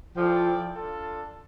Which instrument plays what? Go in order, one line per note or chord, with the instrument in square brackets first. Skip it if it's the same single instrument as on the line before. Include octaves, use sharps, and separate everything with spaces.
[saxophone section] F3 [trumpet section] E4 A4 D5 G5
[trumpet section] D4 F4 A4